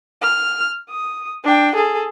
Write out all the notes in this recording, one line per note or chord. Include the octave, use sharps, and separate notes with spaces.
F6
D#6
D4 G5
G#4 A4